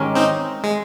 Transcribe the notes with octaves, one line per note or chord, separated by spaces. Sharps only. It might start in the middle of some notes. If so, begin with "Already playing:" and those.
Already playing: G#2 D#3 G#3 C#4 G4
C4 D#4
G#3